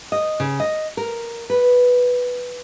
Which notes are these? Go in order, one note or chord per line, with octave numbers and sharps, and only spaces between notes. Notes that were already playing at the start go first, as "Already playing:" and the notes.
D#5
C#3
D#5
A#4
B4